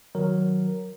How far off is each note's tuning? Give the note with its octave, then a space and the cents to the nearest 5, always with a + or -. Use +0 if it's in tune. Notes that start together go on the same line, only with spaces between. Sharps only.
D#3 +0 F#3 +0 A#4 +0